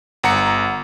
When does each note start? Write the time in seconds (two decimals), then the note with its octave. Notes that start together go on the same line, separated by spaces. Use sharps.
0.24 G1 F#5 A#5 C#7